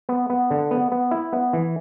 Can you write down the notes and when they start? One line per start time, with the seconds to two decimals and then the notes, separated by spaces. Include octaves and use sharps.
0.09 B3
0.30 B3
0.51 D3
0.71 B3
0.92 B3
1.11 E4
1.33 B3
1.53 E3